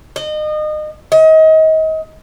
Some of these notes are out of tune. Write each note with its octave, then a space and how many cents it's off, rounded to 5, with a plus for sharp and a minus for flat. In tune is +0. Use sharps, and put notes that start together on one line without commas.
D#5 -30
D#5 +30